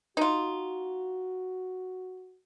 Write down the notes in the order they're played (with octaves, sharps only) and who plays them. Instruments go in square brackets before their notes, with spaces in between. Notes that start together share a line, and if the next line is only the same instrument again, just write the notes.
[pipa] D#4 F4 [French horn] F#4